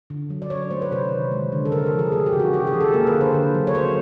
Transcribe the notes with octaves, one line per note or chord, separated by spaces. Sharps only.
D3
F#3
D5
F#3 C#5
A3 C5
B4
C3 C5
D#3
G#3
D3
A4
D3 A#4
A4
F3
G#4
A3 G#4
G4
C#3
F#4
C#3 G4
G#4
E3
A4
A#3 A#4
B4
D3
C5
D3
F#3
C#5
A3 C5